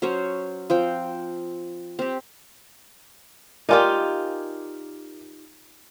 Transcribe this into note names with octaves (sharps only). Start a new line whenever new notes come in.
F#3 C#4 C5 C#5
F3 C4 G5
C4 G4
D#4 F4 G4 A#4 D5 G#5